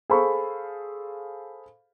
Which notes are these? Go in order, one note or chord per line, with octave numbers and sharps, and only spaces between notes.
G#4 A4 C5 F5 B5 C#6